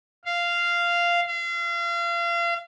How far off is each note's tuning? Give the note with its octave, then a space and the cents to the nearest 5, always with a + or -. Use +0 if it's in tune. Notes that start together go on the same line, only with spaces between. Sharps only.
F5 -10
F5 -35